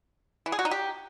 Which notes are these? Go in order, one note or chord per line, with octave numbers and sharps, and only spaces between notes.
E3
G#4
F#4
D#4
G4